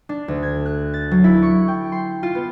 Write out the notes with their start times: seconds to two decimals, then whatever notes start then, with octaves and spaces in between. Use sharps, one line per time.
0.09 D4
0.28 D2
0.43 G#6
0.66 F#6
0.94 A6
1.11 F#3
1.24 E4
1.42 C#6
1.68 G5
1.92 C6
2.23 F4
2.35 B3